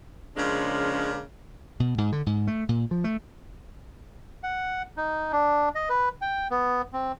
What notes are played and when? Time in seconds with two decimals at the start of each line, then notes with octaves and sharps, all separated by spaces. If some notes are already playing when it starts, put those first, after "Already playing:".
0.37 C#3 F3 G#3 A#3 C#4 D4
1.80 B2
1.98 G#2
2.12 D3
2.26 G#2
2.47 A3
2.69 A#2
2.91 F3
3.04 A3
4.43 F#5
4.97 D#4
5.32 D4
5.75 D#5
5.89 B4
6.22 G5
6.51 B3
6.93 C4